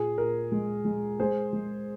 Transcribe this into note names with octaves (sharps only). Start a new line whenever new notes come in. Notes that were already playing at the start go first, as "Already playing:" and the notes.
Already playing: A#2 G#4
A#2 A#4
G#3
G#3
G#3 G#4 C5
G#3